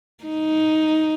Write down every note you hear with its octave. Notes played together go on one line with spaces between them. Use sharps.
D#4